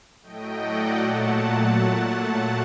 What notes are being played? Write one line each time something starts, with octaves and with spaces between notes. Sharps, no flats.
A2 F#3 A3 D#5 G5
D5 F#5
A#2 F#3 A3 F#5 A5